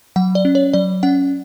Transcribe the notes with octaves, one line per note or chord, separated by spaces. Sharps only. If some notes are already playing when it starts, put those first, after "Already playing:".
F#3 F#5
D5
C#4
C#5
F#3 D5
C#4 F#5